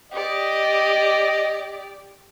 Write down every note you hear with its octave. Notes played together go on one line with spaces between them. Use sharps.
G4 D5 D#5